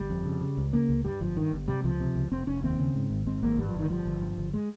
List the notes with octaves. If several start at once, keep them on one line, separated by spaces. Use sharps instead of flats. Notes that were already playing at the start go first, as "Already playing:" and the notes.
Already playing: G1 G3
F2
C#3
C#3
C#2
C#3 A#3
C#2
G2 G3
G1 F3
G2 D#3
G1
C3 G3
C#2 F3
C3
C#2
F1 C4
F1 C#4
D#2 C4
C#3
G#2
G#1
G#2 C4
G#1 A#3
G2 G3
F3
G1
D#3
G2 F3
G1
G2
G1
G#3